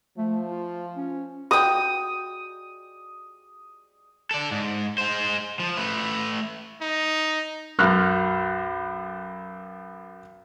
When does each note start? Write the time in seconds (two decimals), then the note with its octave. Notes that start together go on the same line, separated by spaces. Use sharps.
0.18 F3 A3
0.50 F4
0.96 C#4
1.51 F#4 G5 D#6
4.31 A4 D5
4.51 G#2
4.98 G#3 C5
5.60 F3
5.77 A3 B4
6.81 D#4
7.79 B1 F#2 C#6 F6 F#6